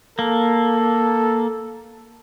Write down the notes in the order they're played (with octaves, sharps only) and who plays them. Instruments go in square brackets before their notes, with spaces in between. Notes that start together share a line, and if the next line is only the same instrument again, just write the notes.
[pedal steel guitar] A#3 [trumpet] A4